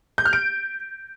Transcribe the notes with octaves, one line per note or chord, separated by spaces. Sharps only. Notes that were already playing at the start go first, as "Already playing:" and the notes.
G6
F6
D7